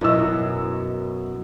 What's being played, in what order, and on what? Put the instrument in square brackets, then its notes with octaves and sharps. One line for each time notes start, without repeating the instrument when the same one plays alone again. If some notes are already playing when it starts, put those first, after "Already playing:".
[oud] F#2 B2 [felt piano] E4 D#5 E6